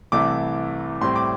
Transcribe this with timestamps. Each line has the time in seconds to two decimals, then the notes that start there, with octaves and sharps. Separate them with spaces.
0.12 C2 C3 E3 A3 D6
1.01 A2 G3 C4 C6
1.16 D6